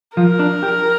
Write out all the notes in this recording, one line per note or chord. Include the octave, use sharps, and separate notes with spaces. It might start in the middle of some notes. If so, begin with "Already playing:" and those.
F3 A#4
D4
G4